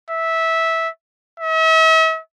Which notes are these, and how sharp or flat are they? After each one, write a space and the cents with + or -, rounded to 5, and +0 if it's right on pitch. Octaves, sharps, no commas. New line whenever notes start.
E5 -15
E5 -40